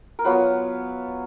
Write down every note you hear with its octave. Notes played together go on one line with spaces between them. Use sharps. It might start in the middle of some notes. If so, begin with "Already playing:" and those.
A#4
F#3 B3 F4 B4